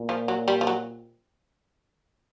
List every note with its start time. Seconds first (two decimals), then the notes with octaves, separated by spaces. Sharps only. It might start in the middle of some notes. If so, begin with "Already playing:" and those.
Already playing: A#2
0.09 F3
0.28 F#3
0.48 G3
0.61 F3
0.67 F#3